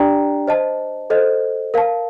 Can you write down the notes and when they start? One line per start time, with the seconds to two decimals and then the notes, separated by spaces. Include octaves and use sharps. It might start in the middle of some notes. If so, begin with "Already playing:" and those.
Already playing: D4 G4 D5 G5 A#5
0.47 C5 D#5 A5
1.10 A4 C5 D#5
1.74 A#4 F5 A5